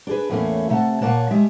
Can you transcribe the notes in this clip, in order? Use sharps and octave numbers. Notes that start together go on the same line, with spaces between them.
D4 G#4 B4
E2 A2 A3 A#3 C#4
C3 A3 F#5 A5
A#2 A#3 C#5 F#5 A5
G3 G#3 E5